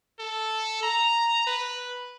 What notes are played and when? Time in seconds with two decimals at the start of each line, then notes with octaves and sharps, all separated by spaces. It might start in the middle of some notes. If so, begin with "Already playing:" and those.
0.19 A4
0.83 A#5
1.47 B4